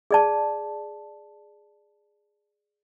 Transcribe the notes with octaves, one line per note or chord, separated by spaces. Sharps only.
G#4 D5 A5